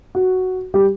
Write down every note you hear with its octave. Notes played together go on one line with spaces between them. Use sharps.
F#4
G3 G4